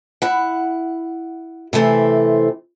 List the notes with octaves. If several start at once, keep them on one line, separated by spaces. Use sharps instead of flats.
E4 F#5
C3 E3 A3 C4 E4